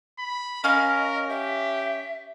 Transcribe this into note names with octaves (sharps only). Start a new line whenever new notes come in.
B5
C#4 A#4 D#5 F5
G4 E5